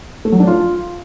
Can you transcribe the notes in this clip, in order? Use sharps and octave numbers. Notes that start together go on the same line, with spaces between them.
A3
F#3
D4
F4